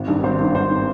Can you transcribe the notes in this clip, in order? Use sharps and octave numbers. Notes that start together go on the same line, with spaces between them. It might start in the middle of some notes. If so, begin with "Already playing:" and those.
Already playing: G#1
G2 D#3
G#1 C5
G2 D#3
G#1 C5
D#3